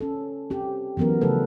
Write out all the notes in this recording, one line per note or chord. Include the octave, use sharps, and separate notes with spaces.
C#4 A4
C4 G4
E3 F#3 B3 C#4 A#4
C#3 F3 A3 A4 B4